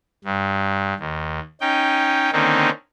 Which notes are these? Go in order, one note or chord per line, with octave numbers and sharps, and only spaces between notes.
G2
D#2
C#4 D#4 G5
D3 D#3 A#3 C4 C#4 D#4